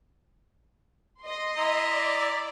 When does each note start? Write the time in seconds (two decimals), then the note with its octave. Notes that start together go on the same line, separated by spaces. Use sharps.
1.22 D#5 C6
1.57 E4 A#5
1.89 D5